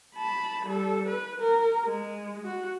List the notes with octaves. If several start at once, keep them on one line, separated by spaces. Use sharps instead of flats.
A5 B5
G3 A4
B4
A#4
G#3
F#4